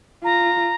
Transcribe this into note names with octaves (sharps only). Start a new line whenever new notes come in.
F4 A#5